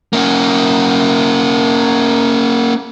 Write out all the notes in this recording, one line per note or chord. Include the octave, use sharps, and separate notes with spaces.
A#3 C#4